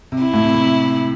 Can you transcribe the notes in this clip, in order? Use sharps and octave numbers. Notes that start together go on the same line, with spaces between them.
C3
E4
A2
C3
C3